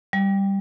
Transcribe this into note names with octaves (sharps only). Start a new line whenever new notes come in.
G3